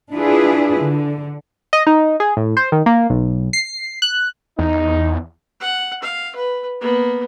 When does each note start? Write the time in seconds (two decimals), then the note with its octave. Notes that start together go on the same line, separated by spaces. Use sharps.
0.13 D4 E4 F4 G#4 B4
0.82 D3
1.73 D#5
1.87 D#4
2.20 G#4
2.37 A2
2.57 C5
2.72 D#3
2.86 A#3
3.10 B1
3.53 C7
4.02 F#6
4.59 E2 D#4
5.61 F#5
6.02 F5
6.35 B4
6.81 A#3 B3